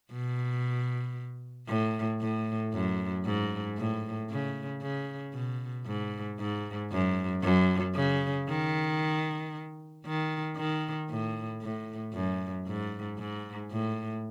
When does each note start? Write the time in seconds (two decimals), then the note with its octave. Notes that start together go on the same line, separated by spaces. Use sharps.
0.12 B2
1.68 A2
2.20 A2
2.73 F#2
3.25 G#2
3.78 A2
4.30 C#3
4.82 C#3
5.34 B2
5.86 G#2
6.39 G#2
6.92 F#2
7.43 F#2
7.95 C#3
8.49 D#3
10.05 D#3
10.56 D#3
11.10 A2
11.61 A2
12.13 F#2
12.66 G#2
13.18 G#2
13.71 A2